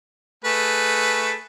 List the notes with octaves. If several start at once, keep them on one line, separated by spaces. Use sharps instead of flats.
A3 G#4 B4